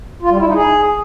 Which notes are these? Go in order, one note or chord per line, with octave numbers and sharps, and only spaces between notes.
F4
G3
E4
D#4
G#4